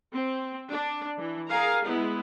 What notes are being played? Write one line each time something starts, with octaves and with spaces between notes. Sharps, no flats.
C4
D4
E3
G#4 A#4 F5 G#5 A#5
G#3 B3 E4